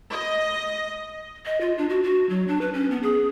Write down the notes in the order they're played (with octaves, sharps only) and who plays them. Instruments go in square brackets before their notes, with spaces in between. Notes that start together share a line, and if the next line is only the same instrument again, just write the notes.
[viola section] D#5
[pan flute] D#5
F4
D4
F#4
F#4
F#3
D4
B4
C#4
B3
G#4